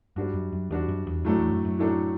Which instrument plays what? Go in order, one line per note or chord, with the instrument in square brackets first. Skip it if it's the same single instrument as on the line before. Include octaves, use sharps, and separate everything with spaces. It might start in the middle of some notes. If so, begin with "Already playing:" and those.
[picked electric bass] G2 [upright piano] G3 D4 F#4
[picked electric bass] F#2
F#2
[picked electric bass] E2 [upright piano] G3 D4 F#4
[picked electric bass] F#2
E2
[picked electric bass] F#2 [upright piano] A2 F#3 A3 D4 A4
[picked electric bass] E2
F#2
F#2
[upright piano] A2 F#3 A3 D4 A4